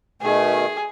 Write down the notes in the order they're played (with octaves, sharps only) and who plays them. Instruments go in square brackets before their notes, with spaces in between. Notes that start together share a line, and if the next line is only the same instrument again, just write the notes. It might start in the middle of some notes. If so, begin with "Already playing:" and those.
[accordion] B2 D#3 A3 [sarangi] G#4